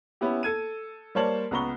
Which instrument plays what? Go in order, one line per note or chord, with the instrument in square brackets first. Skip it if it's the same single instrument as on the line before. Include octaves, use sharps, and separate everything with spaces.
[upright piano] B3 C#4 E4 G4
A4 G#6 D#7
G3 A#3 C5 C#5 A5 F#7
C#2 B3 A#5 C#6 G7